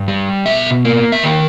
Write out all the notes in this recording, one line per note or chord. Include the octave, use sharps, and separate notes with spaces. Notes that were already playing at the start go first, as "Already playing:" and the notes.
Already playing: G2
G3
B2 E5
A#3
E5
D#3 G5